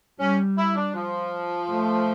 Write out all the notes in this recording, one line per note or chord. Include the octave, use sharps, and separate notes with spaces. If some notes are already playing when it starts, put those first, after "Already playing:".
G3 C#4
E4
D4
F3
A3